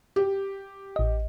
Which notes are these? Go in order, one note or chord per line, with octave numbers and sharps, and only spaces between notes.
G4
A1 D#5